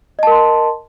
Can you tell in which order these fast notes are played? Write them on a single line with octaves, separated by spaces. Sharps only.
D#5 A5 A#4 C6